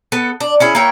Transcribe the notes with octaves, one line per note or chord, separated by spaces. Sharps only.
B3 A4
D4
C#4 E4 G#4
A#3 E4 C#5 G5